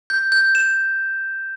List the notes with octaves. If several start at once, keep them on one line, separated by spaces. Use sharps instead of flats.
G6
G6
E7